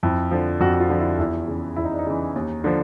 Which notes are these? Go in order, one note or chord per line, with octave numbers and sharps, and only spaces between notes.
F2 E4
D3 F3
F2 F#4
F#4
F4
D3 F3
E4
E2 E4
C#3 E3
E2 E4
D#4
D4
D#4
C#3 E3
D#2
D3 F3